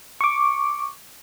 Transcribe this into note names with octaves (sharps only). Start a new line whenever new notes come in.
C#6 D6